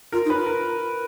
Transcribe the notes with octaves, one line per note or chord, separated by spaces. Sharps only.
F4 A#4
D#4
B4
F4
A#4